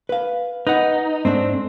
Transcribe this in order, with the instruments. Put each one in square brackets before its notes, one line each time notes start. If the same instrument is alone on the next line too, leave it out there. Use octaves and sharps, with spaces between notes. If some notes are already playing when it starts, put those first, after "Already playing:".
[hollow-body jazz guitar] B4 F5
[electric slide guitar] D#4 [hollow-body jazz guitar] B4 F#5
[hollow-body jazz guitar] G#2 A3 D4 [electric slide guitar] C4